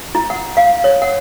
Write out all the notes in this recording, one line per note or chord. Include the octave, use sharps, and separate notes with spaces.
E4
F#5
F5
C#5
F#5